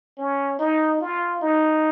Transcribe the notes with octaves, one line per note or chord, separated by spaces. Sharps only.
C#4
D#4
F4
D#4